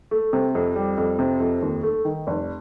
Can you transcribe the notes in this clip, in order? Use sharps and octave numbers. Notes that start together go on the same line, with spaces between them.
A3
C3
F2
G3
F2
C3
F2
D#2
A3
D#3
F1